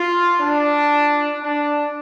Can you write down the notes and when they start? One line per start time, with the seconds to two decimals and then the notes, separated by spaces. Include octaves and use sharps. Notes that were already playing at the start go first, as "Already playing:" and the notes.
Already playing: F4
0.40 D4
1.41 D4